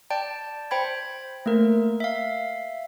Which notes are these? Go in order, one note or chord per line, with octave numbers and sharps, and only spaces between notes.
D5 G5 A5
C5 G5 B5 G#6
A3 A#3 A#4
E5 F5